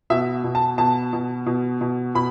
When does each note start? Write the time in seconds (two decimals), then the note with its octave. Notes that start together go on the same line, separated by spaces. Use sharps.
0.10 B2 E5
0.44 B2
0.55 A5
0.78 B2 A5
1.13 B2
1.46 B2
1.81 B2
2.15 B2 B5